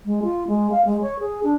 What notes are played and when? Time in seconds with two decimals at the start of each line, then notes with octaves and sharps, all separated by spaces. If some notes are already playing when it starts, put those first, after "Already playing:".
0.05 G#3
0.23 F4
0.48 G#3
0.71 F5
0.85 G#3
1.01 C#5
1.19 G#4
1.43 D4